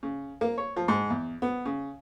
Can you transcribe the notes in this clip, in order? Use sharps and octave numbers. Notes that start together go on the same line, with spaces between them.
C#3
A#3
C#5
F3
G#2
E2
B3
C#3